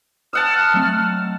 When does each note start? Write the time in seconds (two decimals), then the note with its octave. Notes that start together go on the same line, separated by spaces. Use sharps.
0.33 D#5 F#5 A5 E6 F6 E7
0.74 F#3 A3 C4